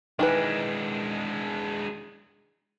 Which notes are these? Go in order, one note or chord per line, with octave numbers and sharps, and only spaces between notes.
D#3 E3 G#3 D4 B4